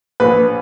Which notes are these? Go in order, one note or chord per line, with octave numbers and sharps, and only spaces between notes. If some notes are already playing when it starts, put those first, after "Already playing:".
A#1 B4